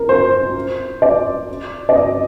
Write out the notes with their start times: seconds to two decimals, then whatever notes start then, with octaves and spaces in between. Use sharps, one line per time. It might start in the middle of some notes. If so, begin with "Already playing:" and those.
Already playing: A#4
0.09 C5
1.02 D5
1.89 D5
1.95 D#5